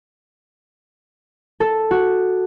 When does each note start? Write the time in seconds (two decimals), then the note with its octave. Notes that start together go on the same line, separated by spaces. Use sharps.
1.60 A4
1.91 F#4